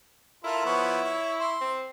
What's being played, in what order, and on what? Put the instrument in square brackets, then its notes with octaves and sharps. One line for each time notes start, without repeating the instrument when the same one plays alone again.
[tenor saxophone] E4 [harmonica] F4 A4 A#4
[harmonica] F3 B3 C#5
C#5
C6
[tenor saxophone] C4